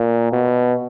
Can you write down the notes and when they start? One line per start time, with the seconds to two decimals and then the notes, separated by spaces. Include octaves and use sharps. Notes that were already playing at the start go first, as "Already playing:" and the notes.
Already playing: A#2
0.32 B2